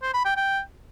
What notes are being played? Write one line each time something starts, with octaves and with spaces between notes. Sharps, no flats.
C5
B5
G5
G5